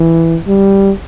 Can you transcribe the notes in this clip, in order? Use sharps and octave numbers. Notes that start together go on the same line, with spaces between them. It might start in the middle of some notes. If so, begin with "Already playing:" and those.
Already playing: E3
G3